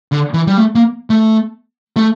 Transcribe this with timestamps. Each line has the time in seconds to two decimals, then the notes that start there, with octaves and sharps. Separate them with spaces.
0.12 D3
0.34 E3
0.47 G3
0.58 A3
0.75 A#3
1.10 A3
1.96 A3